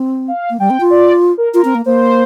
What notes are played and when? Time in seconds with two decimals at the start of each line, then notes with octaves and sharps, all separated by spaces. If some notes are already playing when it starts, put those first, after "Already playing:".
Already playing: C4
0.28 F5
0.50 A#3
0.59 G3 G5
0.70 C4
0.80 F4
0.90 D5
1.38 A#4
1.54 F4 A#4
1.64 C4
1.75 A#3
1.86 A#3 C5